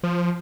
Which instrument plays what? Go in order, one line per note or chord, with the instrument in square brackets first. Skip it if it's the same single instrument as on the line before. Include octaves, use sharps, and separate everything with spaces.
[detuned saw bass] F3